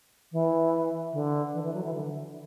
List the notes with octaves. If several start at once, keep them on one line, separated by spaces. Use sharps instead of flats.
E3
D3
E3
E3
F#3
E3
D3